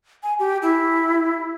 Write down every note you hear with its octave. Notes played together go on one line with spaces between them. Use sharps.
G#5
G4
E4